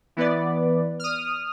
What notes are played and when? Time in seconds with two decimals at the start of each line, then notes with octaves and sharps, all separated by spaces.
0.17 E3 B3 B4 D5
0.99 D#6 F6